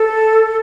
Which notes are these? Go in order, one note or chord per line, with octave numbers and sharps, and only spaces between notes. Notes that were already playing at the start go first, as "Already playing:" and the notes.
Already playing: A4